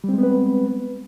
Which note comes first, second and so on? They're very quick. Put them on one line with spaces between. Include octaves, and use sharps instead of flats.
G3 C4 G#3 B3 B4